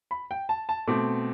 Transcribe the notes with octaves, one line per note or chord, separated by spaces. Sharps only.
B5
G5
A5
A5
B2 A3 C4 D6